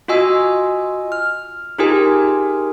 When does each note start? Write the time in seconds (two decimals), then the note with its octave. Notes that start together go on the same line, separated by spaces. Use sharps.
0.08 F4 F#4 D#5 G#5 E6
1.12 F6
1.78 D#4 F4 G4 G#4 A#4 G#5